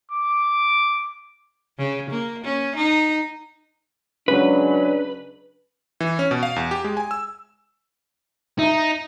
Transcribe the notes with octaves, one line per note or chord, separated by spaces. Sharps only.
D6
C#3
A#3
C#4
D#4
C#3 F#3 G#3 D4 B4
E3
C#4
B2
F5
E2
G4
G#3
G#5
E6
D#4 E5 A#5